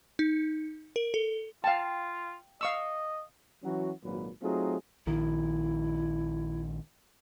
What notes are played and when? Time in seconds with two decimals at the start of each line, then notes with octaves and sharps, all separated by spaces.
0.19 D#4
0.96 A#4
1.14 A4
1.64 F4 F5 G5 A5
2.61 D#5 F5 C#6 E6
3.64 E3 F#3 C#4 F#4
4.04 G#1 A#2 F#3 B4
4.41 F#3 A3 C4 D#4 F4 G#4
5.07 A#1 D#3 E4